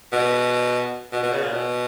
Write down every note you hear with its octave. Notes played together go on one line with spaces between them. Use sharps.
B2
B2
B2
C#3
A#2
B2